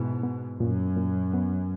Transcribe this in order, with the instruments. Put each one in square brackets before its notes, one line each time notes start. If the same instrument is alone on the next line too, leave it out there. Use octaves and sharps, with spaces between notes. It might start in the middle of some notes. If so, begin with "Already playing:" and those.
Already playing: [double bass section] G#2 B2 [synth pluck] E4
[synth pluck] B3
[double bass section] F#2 [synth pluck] A#2
[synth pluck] A#2
B3